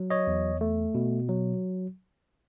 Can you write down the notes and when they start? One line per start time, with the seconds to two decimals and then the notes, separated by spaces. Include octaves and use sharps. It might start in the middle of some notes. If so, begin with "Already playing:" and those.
Already playing: F#3
0.10 C#5 D#5
0.27 E2
0.61 A3
0.95 B2
1.29 F#3